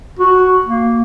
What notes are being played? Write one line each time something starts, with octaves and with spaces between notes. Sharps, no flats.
F#4
A#3